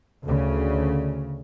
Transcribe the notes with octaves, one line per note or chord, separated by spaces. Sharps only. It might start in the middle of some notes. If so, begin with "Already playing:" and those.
D2 C#3